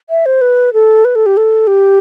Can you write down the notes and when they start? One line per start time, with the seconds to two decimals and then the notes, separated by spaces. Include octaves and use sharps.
0.10 E5
0.26 C5
0.41 B4
0.73 A4
1.05 B4
1.15 A4
1.26 G4
1.37 A4
1.67 G4